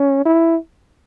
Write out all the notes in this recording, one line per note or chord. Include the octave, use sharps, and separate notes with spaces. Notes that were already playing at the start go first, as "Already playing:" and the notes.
Already playing: C#4
E4